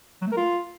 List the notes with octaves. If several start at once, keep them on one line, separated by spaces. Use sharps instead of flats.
F#3
A3
A#4
F4